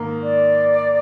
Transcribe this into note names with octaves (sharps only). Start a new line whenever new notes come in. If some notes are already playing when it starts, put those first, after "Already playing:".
Already playing: G#2 D#3 A#3
D5